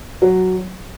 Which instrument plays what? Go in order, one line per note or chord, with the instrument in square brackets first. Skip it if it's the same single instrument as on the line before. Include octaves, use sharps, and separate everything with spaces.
[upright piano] F#3